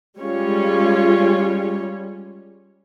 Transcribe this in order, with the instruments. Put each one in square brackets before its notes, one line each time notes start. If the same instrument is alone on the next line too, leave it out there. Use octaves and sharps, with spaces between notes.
[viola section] G3 G#3 C#4 F4 C#5